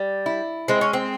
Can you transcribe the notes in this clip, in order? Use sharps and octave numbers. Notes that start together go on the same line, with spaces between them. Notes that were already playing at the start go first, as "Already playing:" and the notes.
Already playing: G3
E4
G#3 C4
C#4
C4